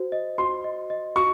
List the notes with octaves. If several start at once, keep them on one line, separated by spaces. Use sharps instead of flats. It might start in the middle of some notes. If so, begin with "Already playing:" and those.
Already playing: F#4 C5
D#5
F#4 C6
D#5
D#5
F#4 C#6